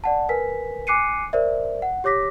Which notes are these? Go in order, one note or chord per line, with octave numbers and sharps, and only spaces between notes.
D5 F#5 A5
A#4 B4 G#5 B6
G#5 D6 F#6 C7 C#7 D#7
A#4 C5 D5 E5
F#5
G4 C#5 D6 A#6 B6